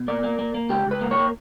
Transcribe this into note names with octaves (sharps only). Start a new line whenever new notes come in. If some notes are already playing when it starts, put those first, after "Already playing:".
Already playing: B2
A#3 D5
A#3
A#3
A#3
C#2 G4
C#2 B4
A#3
C#5
A#3